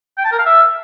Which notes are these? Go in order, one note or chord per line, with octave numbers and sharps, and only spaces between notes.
G5
A5
A#4
F5
E5